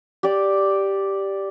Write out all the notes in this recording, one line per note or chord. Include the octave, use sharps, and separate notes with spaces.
G4 D5